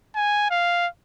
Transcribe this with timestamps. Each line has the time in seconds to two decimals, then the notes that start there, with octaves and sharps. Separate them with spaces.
0.15 G#5
0.50 F5